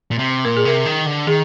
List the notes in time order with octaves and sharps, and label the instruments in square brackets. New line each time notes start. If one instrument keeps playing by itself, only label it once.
[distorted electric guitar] A#2
C3
[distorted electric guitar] A#2 [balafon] A#4
[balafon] G#4
[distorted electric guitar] C3 [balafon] A#4
[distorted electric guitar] D#3
D3
[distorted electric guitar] D#3 [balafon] G#4